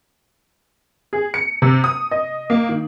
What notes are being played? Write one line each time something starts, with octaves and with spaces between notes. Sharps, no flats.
G#4
C#7
C3
D#6
D#5
A#3
D#3